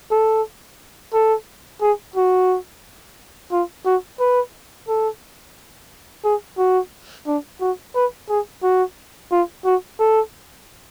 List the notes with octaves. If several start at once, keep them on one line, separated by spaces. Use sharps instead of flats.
A4
A4
G#4
F#4
F4
F#4
B4
A4
G#4
F#4
D4
F#4
B4
G#4
F#4
F4
F#4
A4